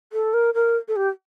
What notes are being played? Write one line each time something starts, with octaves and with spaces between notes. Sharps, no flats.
A4
A#4
A#4
A4
G4